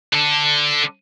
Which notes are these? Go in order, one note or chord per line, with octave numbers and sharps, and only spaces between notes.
D3 A4